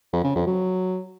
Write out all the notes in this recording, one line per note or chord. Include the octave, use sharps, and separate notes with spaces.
F2
C#3
F2
F#3